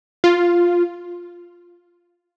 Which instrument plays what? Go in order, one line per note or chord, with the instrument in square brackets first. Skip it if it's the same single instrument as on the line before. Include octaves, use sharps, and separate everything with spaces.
[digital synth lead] F4